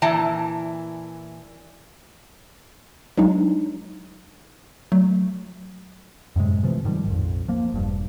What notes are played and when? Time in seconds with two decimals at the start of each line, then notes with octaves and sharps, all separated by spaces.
0.02 A#2 E3 A5
3.17 F#3 G#3 D4 D#4
4.92 F#3 A3
6.36 F#2 A2 C3 G#3
6.63 C3 E3 F3 A3
6.85 G#2 D#3 F3 G3
7.07 A#1 F2
7.48 F3 A#3
7.72 E1 G2